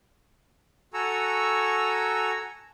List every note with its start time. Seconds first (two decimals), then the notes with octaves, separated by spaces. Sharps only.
0.94 F#4 A4 G#5 A#5 C#6 E6